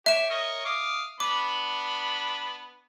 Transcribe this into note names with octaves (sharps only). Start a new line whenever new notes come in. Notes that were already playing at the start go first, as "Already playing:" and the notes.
G4 C#5 E5 E7
A#4 C#5 D#5
F5 D6 D#6
B3 D4 B5 D6